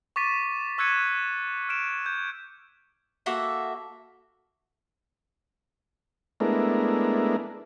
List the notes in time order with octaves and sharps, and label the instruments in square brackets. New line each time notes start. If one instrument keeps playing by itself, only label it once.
[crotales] C#6 D6 A6 B6 D#7
C#6 E6 F#6 G#6 C#7 D#7
F6 D7 E7
G6
[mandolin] A#3 F#4 A4 E5
[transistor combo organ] G#3 A3 B3 D4 E4 A#4